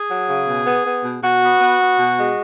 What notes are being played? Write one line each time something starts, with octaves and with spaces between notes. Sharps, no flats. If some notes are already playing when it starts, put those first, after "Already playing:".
Already playing: G#4
F#3
C#3
B2
B3
B3
B2
B2 F#4
B3
B3
B3
B2
G#3